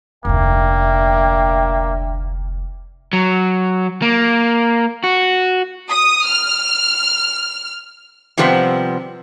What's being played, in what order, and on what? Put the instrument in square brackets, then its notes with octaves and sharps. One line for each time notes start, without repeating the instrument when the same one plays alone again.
[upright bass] F1 D2 [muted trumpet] A#3 [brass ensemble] D4 E5 G5
[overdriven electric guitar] F#3
A#3
F#4
[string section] D#6
F6
[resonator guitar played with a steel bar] C3 F3 G3 B3 C4